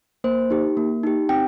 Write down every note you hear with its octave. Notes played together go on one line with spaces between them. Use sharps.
A#3 C5
D#4 G4
A#3
D#4 G4
C4 G5